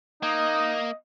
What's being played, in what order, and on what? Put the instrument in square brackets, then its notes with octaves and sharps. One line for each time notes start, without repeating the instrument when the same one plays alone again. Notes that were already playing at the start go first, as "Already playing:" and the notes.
[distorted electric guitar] A#3 [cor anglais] D#4 [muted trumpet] D#5